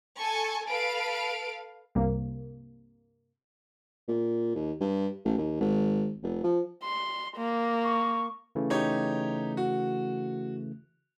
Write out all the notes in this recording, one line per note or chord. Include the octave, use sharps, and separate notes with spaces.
A4 G#5 C#6
A4 B4 F5 D7
C2 G2 C3 A#3
A#2
D#2
G2
A1
D#2
G#1
F1
F3
C6
A#3
C#6
C#3 E3 A3
D#4 G4 C#5
F#4